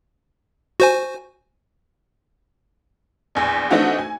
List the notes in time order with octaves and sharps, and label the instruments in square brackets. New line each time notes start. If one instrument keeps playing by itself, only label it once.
[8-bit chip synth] F#4 C5 G#5
[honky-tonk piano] A#1 E2
E3 A3 C4 D4 D#4 F#4
G#5